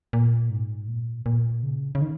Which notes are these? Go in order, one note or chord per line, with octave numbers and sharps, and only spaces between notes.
A#2
G#2
A#2
A#2
C#3
C#3
D#3